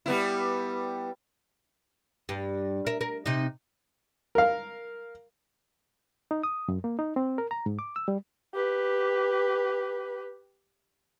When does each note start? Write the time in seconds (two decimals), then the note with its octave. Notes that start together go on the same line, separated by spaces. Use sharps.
0.06 G3 B3 E4
2.29 G2
2.87 A#4 E5
3.01 A#4
3.26 C3 D#4
4.35 A#4 F5
6.31 D#4
6.43 D#6
6.68 F#2
6.84 A#3
6.99 D#4
7.16 C4
7.38 A#4
7.51 A#5
7.66 G#2
7.79 D6
7.96 E6
8.08 G3
8.54 G4 B4